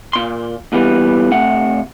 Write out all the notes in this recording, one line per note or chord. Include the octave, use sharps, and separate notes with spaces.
A#2 C6
A#2 E3 G3 B3
C3 A3 F#5